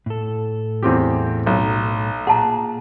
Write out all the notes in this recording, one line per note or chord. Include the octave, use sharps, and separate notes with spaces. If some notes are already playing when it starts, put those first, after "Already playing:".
A2 A4
E2 C4 G4
B1
A#2 G#4 F#5 A5 A#5